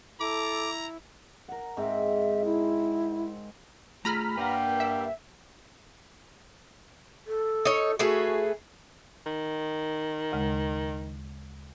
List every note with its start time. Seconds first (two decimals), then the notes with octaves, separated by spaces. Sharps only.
0.21 E4 A4 A#5 D6
1.48 A#4 F#5
1.77 G#2 C4 E5
2.45 E4
4.05 A3 F4 G#4 A#5 B5 F6
4.37 G2 G3 A#3 B4 F#5 G5
4.80 E5
7.27 A4
7.65 D#4 C#5
7.99 A3 F#4 G#4 B4
9.26 D#3
10.32 D2 C#3 G#3